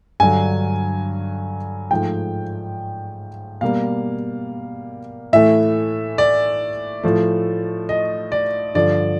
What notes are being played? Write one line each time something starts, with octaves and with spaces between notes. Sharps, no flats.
G2 D3 F#3 G#5
G#2 F3 A3 G5
B2 G3 A#3 F5
A2 E3 A3 E5
D5
A2 F3 A3
D#5
D5
G2 D3 F3 D5